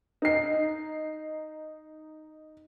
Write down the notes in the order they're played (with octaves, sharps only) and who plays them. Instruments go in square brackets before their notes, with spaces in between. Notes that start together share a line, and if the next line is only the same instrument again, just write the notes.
[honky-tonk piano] D#4 C7